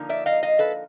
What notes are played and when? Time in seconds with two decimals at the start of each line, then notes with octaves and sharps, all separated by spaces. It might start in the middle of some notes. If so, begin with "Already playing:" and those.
Already playing: D3 F3 A#3 D#4
0.09 D5 E5
0.26 D#5 F5
0.43 D#5 F5
0.59 A4 B4